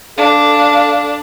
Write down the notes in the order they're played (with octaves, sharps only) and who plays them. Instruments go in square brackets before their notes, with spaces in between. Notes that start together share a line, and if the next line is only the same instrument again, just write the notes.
[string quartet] D4 [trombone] A4 [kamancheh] F5